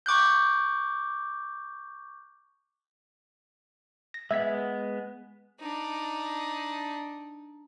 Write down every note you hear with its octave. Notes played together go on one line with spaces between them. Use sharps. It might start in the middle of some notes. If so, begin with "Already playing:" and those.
C#6 D6 F#6 G6
A#6
G#3 B3 E5 G#6 B6
D4 D#4